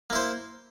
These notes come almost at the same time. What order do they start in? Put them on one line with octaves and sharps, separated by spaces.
A#3 E4 C5